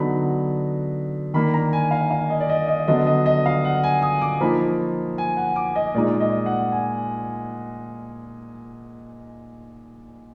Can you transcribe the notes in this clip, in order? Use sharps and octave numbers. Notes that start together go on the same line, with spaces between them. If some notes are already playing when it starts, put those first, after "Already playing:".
Already playing: D3 F#3 B3 D#4 B5
D#3 A#3 D4 B5
A#5
G#5
F5
F5
D#5
D5
D#5
D#5
D3 F#3 B3 D#5
D#5
D#5
F5
F#5
G#5
D#6
D6
F3 A#3 D#4 B5
G#5
F#5
D6
D#5
A#2 G#3 D#4 D5
D#5
F#5
G#5